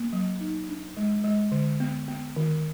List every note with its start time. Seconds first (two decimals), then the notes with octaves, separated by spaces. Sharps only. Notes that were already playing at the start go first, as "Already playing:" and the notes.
Already playing: A#3
0.13 F#3
0.40 D#4
0.69 D4
0.97 G#3
1.24 G#3
1.52 D3
1.80 B3
2.08 B3
2.36 D#3